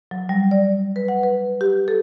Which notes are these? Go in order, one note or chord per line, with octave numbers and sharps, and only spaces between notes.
F#3
G3
D5
B4
F#5
B4
G4
A4